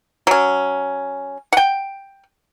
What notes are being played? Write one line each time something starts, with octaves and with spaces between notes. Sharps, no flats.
F#3 C#4
F#5 G5